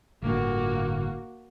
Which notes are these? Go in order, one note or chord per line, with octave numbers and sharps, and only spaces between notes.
G1 A2 D3 A#3 F#4